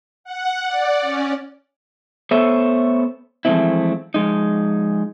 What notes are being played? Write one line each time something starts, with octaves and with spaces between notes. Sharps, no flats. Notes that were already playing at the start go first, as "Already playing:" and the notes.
F#5
D5
C#4
A3 B3 A4 C5 C#5 E5
E3 F3 G#3 A3 C4 E4
F3 G#3 D#4